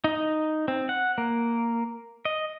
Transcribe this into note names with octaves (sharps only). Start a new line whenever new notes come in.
D#4
C4
F#5
A#3
D#5